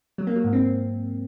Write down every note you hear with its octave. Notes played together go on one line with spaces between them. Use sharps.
F#3
A#3
F#3
G#2
C4